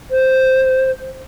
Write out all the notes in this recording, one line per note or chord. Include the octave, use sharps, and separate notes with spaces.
C5